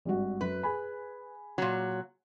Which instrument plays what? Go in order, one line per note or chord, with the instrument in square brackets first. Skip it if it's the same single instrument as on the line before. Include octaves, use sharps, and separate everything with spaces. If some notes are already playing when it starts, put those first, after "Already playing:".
[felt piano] G#1 G2 F#4
[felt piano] F#2 [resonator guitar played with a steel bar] B4
[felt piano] G#4 G#5 B5
[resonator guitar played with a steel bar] A#2 F#3